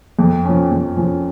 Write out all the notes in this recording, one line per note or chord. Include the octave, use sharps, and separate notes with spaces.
F2
F3 C#4
F2
F3 C#4